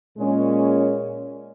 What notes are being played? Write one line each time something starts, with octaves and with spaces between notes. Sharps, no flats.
A#2 G#3 C#4